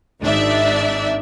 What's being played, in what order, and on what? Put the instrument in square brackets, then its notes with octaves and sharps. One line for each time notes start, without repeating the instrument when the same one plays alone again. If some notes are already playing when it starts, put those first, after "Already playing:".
[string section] G#1 D4 D#4 D5 E5